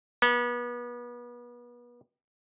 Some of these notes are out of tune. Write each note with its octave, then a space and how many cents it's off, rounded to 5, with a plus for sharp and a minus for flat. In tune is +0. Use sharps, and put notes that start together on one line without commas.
B3 -35